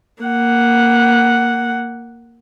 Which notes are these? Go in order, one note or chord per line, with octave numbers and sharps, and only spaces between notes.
A#3 F#5